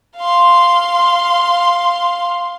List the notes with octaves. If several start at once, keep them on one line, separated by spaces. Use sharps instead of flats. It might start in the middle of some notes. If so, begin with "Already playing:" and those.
F5 C6